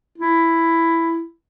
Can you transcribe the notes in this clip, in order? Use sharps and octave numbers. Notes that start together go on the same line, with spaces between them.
E4